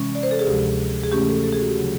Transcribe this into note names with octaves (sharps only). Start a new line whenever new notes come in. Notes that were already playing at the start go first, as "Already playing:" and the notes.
Already playing: C3 E3 G#3 C#4
D5
C5
A4
G#4
D2 C3 F3 G#3 G4
G#4
C3 E3 A3 C#4 G4
A4
A4
G#4
F#4
G4
C#3 F#3